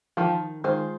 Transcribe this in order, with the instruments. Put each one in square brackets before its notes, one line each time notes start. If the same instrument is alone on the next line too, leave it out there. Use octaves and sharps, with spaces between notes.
[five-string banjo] D#3 [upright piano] F3
[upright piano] D#3 [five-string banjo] G#3 F4 G#4 C5